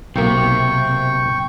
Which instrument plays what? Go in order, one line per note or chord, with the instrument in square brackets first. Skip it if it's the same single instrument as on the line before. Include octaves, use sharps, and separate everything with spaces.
[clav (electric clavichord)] B1 A#3 [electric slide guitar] C3 [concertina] G5 C#6